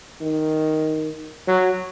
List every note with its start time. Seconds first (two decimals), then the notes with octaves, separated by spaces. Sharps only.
0.21 D#3
1.47 F#3